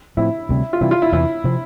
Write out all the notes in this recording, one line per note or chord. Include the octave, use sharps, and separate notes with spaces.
A2 F3 C4 E4
D2 C3 G3
F4
C3 E3 G3 E4
F4
E4
E2 C3 E3 E4
C3 F3 C4